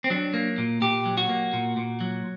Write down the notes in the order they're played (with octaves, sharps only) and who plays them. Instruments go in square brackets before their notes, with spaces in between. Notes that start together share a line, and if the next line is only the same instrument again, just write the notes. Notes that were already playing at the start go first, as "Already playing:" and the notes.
[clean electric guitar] C4
F#3 D4
A#3
A#2
A#2 G4
F#3
F#4
A#3
A#2
A#2
F#3